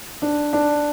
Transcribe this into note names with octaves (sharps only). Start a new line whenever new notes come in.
D4
D4